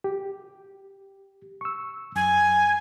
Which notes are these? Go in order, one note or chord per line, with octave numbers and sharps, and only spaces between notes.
G4
C#6 E6
F#2 G#5